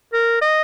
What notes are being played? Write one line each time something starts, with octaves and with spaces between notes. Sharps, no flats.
A#4
D#5